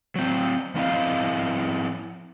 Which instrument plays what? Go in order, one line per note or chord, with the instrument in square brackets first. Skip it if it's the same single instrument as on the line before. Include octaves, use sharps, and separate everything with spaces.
[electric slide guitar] F#3 C4
F3 C4 E4 D#5 F5